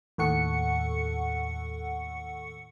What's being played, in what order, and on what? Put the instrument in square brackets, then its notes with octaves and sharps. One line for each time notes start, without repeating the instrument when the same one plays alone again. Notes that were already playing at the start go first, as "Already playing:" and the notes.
[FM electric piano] D#2 A2 A4 F#5 C#6 C#7